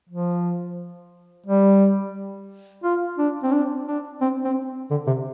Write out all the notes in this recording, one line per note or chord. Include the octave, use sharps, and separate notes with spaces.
F3
G3
F4
D4
C4
D4
D4
C4
C4
D3
C3